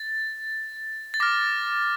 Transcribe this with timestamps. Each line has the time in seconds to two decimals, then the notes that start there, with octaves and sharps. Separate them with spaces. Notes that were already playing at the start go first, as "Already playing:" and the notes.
Already playing: A6
1.14 A6
1.20 D6 F6 A#6